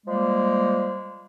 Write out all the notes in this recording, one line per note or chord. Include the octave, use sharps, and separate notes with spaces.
F3 G3 G#3 A#3